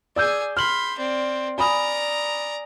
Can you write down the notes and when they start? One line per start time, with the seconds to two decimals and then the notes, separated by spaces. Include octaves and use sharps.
0.16 G#4 D5 G#5 E6 G6
0.57 B5 C6 F6 F#7
0.97 C4 D5
1.58 D5 G#5 A#5 B5 D#6